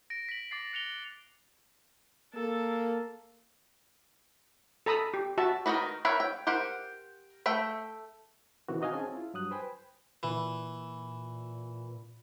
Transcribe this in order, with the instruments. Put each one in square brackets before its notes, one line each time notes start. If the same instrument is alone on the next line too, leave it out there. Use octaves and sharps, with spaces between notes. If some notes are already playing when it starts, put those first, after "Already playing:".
[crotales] A#6 D7
B6 F#7
D6 A6 C7 F#7
F#6 C#7 F7 G7
[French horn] A#3 [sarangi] A4
[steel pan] A4 A#5 B5 D#6 E6
G4
F#4 E5 A5
[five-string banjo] D#3 F3 D#4 F#4 B4
A#4 B4 C#5 E5 G5
G5
G4 A#4 C5 F#5
A3 E5 G5
[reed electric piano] B2 D#3 E3 C4 C#4 F#4
D#4 F#4 D#5 F5 G#5
C4 C#4 G#4 G#5 A5
E4 F4
G2 F#3 D#6 F#6
B4 C5 G5 G#5 B5
[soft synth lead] A#2 [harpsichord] E3